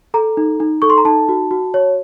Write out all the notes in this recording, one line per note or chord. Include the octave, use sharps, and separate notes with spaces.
A4 A#5
D#4
D#4
A4 C#6
C6
A#5
D#4 A5
F#4
F#4
C#5